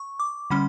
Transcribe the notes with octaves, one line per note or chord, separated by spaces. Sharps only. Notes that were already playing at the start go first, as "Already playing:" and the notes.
Already playing: C#6
D6
D3 G3 C#4 B5